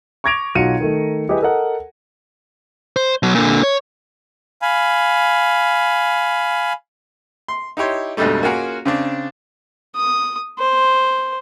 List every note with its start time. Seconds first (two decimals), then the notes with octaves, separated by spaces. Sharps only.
0.24 C#6 D6 G#6 A#6 D7 F7
0.55 B1 F#3 F4 F#4 C#7 D#7
0.80 D#3 A3 D#4
1.29 E4 G4 G#4 B4 D#5
1.42 A4 A#4 D#5 F#5
2.96 C5
3.23 B2 F#3
3.35 A#2 D3
3.63 C#5
4.62 F5 G#5 B5
7.48 C6
7.77 D#4 E4 G4 C#5 C6
8.17 F2 G#2 B2 D3 G3 A3
8.43 A#3 C#4 F4 F#4 G#4 A#4
8.86 C#3 C4 D4
9.96 D#6
10.59 C5